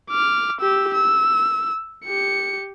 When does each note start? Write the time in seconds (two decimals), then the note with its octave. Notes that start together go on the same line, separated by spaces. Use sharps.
0.10 D6 F6
0.60 G4 E6
0.94 E6
2.05 G4 C#7